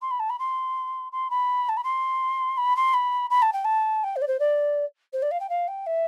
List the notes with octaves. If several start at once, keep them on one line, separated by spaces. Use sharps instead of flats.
C6
B5
A5
B5
C6
C6
B5
A5
B5
C6
B5
C6
B5
B5
A5
G5
A5
G5
C5
D5
C5
D5
C5
D5
F5
G5
F5
G5
E5